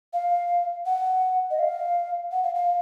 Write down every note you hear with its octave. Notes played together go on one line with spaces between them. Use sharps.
F5
F#5
D#5
F5
F#5
F5
F5